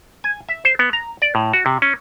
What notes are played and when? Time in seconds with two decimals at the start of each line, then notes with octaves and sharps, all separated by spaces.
0.24 G#5
0.49 E5
0.65 C5
0.79 B3
0.93 A#5
1.22 D5
1.35 A2
1.53 F#4
1.66 C3
1.82 C#4